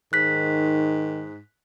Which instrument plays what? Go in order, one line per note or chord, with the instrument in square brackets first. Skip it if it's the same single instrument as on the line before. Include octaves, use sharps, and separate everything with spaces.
[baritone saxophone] G#2 [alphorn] D#3 [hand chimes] F#6 B6